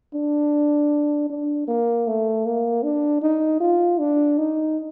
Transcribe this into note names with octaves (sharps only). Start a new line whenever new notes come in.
D4
D4
A#3
A3
A#3
D4
D#4
F4
D4
D#4